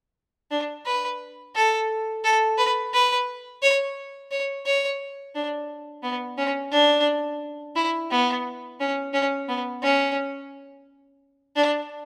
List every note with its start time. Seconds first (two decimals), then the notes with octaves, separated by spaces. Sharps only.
0.51 D4
0.86 B4
1.55 A4
2.24 A4
2.58 B4
2.94 B4
3.62 C#5
4.31 C#5
4.66 C#5
5.35 D4
6.03 B3
6.38 C#4
6.72 D4
7.76 E4
8.11 B3
8.80 C#4
9.13 C#4
9.49 B3
9.82 C#4
11.56 D4